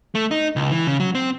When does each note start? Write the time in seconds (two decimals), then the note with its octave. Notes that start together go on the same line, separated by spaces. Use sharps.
0.15 A3
0.31 D#4
0.56 C#2
0.72 E3
0.87 C#3
1.00 F#3
1.15 C4